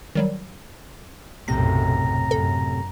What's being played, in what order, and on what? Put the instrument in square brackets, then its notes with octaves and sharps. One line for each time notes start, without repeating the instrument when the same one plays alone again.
[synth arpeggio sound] D#3 F#3 G3
[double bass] B1 F#2 [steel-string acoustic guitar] A2 C3 [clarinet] A#5 [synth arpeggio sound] A#6
[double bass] F#2 [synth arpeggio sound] A4